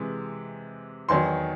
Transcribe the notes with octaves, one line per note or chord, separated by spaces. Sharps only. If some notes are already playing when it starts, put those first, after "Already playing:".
Already playing: C3 E3 G#3
E2 D#3 F#3 C6